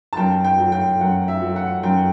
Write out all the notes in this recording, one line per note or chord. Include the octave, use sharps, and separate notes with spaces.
A5
F#2 G5
G5
F#3
G5
F#2 F#5
E5
F#3
F#5
F#2 G5